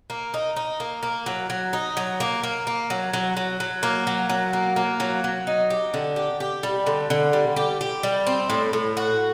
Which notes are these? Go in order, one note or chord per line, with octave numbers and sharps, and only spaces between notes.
A#3
D#4
D#4
A#3
A#3
F#3
F#3
D#4
F#3
A#3
A#3
A#3
F#3
F#3
F#3
F#3
A#3
F#3
F#3
A#3
A#3
F#3
F#3
D#4
G4
D3
G4
G4
G3
D3
D3
G3
G4
G4
G3
C4
A2
A2
F#4